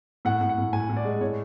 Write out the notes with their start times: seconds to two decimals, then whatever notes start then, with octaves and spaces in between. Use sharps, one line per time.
0.25 A2 F#5
0.41 A2
0.49 F#5
0.58 A2
0.73 A2 G#5
0.89 A2
0.97 D5
1.05 G#3
1.21 A2 C#5